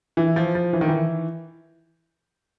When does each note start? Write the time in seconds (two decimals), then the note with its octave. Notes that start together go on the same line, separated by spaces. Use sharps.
0.17 E3
0.36 F3
0.55 F3
0.73 E3
0.81 D#3
0.88 E3